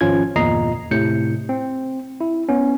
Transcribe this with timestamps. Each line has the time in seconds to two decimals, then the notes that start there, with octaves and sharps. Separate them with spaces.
0.01 G#1 F3 C#4 F4 G#6
0.36 G1 E2 A#2 D#5 A#5 C7
0.91 A2 C3 G6 C#7
1.49 C4
2.21 E4
2.49 B3 C#4